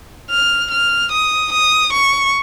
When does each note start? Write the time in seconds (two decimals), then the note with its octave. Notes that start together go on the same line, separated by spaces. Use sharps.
0.31 F6
0.71 F6
1.12 D#6
1.53 D#6
1.93 C#6